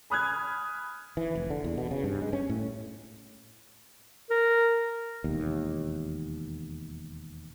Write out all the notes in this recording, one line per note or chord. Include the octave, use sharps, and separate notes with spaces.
G#5 B5 D#6 F6 F#6 G#6
E3
F1
D3
E2
B2
C#3
G2
G#3
C#4
A2
A#4
E1 D#2